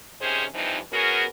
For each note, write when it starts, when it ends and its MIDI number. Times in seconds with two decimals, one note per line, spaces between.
0.21 0.45 48
0.21 0.45 51
0.21 0.45 61
0.21 0.45 68
0.21 0.45 72
0.54 0.77 43
0.54 0.77 52
0.54 0.77 53
0.54 0.77 60
0.54 0.77 63
0.92 1.25 59
0.92 1.25 61
0.92 1.25 66
0.92 1.25 68
0.92 1.25 70